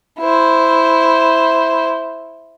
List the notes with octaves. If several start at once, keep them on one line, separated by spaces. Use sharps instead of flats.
E4 C5